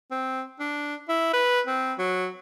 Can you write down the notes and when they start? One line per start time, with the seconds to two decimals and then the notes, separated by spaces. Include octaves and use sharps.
0.11 C4
0.60 D4
1.09 E4
1.33 B4
1.67 C4
1.99 F#3